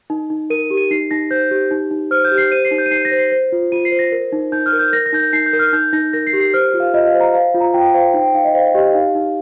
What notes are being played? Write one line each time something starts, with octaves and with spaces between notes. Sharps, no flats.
D#4
D#4
A#4 D#7
G4
D#7
D#4 C7
D#4 A#6
C5 G6
G4
D#4
D#4
C5 F6
G6
G4
C7
C5 D#7
C7
D#4
G6
D#7
D#4 C7
A#6
C5
C7
C5
F4
F4 D#7
C7
C5
A#6
A#4
D#4
D#4 G6
F6
A#4
G6
A#4 A#6
A#6
D#4 G6
A#6
D#4 C7
G6
A#4
F6
D#4 G6
D#4 A#6
A#4 A#6
C7
G4
C7
C5 F6
F4
F5
F4 D#5
F5
C5
A#5
C5 F5
F4
A#5
F4 G5
C5 F5
D#4 G5
G5
D#4 F5
D#5
C5 F5
G4 D#5
D#4 F5
D#4